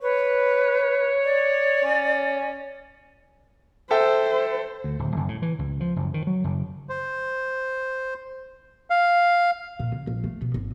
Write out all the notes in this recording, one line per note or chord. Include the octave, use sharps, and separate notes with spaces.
B4 C#5
D5
C#4
A4 C5 E5 G5
D2
D1
F#1
A2
E3
C#2
F3
F#1
D#3
F#3
F#1
C5
F5
A#2
C#3
A#1
A3
B2
G#1